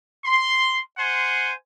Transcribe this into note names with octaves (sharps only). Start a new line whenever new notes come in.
C6
C5 F#5 G#5 C6